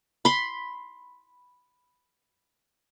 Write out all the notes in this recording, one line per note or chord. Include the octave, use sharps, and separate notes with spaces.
B5 C6